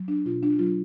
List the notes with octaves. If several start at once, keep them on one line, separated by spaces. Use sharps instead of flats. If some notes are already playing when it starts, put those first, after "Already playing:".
Already playing: F#3
D4
B2 F4
D4
F#3 F4